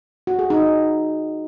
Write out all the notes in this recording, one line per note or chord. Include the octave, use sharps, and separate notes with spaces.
F#4
G#4
D#4